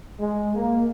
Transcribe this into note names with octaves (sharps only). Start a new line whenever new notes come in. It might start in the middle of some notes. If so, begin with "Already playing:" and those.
G#3
A#3